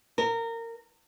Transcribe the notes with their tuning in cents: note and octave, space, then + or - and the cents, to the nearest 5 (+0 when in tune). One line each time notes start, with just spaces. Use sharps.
A#4 -20